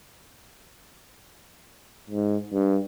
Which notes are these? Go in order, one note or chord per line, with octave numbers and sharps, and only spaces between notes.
G#2
G2